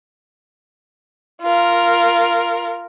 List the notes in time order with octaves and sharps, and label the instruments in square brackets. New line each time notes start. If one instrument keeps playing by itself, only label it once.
[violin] F4 A#4